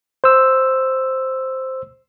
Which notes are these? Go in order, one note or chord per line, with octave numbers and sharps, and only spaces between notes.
C5 E6